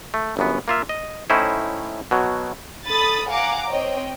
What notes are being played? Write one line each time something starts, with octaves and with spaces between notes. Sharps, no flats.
A3
G1 F#2 B3
A#3 F4 E5
D#5
A2 C#4 D#4 E4 C5
B2 F#3
A4 B5 D#6 A6
F5 F#5 G#5 A#5 D6
C4 C#5 D#5 G5